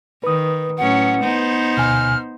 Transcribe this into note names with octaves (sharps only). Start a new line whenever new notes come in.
D#3 B4 D#6
A2 F#3 C#4 F#5
B3 D#4 C5
D2 B2 G#5 F6